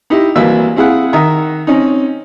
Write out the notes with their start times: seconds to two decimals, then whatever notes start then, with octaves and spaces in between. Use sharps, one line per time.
0.10 D#4 E4 G4
0.36 C2 E3 F#3 A#3 E5 E6
0.76 C4 E4 G#4 F5 F#5
1.13 D#3 E5 F#5 A#5 D#6
1.67 C4 C#4 D#4